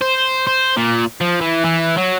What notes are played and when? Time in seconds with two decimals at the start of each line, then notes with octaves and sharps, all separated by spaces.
0.02 C5
0.47 C5
0.77 A#2
1.21 F3
1.41 E3
1.65 E3
1.98 F#3